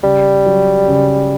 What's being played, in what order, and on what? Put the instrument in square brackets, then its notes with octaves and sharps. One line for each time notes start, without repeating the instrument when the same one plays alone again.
[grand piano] C#3 [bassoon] G3
[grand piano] F#3
C#3